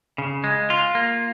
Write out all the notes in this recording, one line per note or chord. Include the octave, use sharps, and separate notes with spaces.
C#3
G#3
F4
A#3